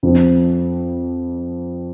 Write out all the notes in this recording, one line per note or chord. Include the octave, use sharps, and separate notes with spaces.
F2 F3 C4